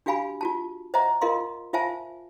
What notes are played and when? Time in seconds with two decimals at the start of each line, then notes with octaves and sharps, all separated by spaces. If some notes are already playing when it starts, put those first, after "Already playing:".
0.06 D4 F#4 G4 F5 G#5 B5
0.41 F4 F#4 A5
0.94 C5 D#5 E5 F#5 A#5
1.21 F4 A#4 D#5 F5 C6
1.73 F4 C5 E5 F5 G#5 A5